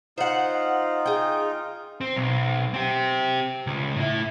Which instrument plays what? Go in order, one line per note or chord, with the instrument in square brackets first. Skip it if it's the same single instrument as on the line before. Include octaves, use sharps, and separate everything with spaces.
[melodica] D#4 F4 [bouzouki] C5 F#5
[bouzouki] G#4 G5
[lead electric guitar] C4
B1
C4 G4
C#2
A2 E4